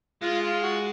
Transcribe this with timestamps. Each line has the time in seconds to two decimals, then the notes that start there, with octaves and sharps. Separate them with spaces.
0.23 G#3 F4
0.43 F4
0.63 F#4